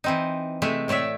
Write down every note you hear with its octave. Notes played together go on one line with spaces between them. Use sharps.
E3 C4 D#4
C3 G#3 A3 E5
A2 A3 C#5 D5 E5